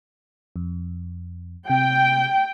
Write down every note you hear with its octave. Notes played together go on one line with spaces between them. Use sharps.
F2
C3 G5